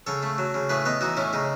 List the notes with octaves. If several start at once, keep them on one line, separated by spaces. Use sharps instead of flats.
C#3 A4 C#5
A3
F#3
C#3
A2 G#4 B4
B3 B4 D#5
E3 D#4 F#4
A2 C#4 E4
C#3 D#4